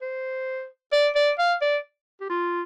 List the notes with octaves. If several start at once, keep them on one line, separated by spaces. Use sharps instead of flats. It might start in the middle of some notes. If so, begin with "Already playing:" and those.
C5
D5
D5
F5
D5
G4
F4